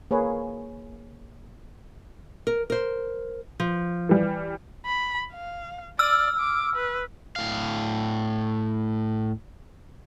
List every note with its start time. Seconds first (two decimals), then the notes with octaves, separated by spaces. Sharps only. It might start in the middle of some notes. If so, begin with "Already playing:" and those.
0.11 A#3 G#4 B4 C#5
2.47 A#4
2.70 A#4 C5
3.60 F3
4.09 E3 G3
4.85 B5
5.32 F5
5.99 D5 E6 F6
6.39 D6
6.76 B4
7.36 A2 F5